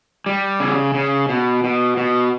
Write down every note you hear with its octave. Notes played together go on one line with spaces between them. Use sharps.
G3
C#3
C#3
B2
B2
B2